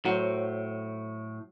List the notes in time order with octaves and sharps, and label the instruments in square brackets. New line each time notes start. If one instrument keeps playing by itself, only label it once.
[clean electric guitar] A2 [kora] F#3 C5